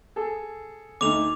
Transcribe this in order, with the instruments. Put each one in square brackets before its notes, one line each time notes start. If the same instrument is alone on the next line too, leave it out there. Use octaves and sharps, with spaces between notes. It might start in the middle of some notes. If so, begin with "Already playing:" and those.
[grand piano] G#4 A4
[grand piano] D2 D#4 [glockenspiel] D6 F7